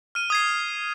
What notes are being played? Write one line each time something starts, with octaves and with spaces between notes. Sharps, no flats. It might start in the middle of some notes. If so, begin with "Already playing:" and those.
F6 D#7
D#6 G#6 C7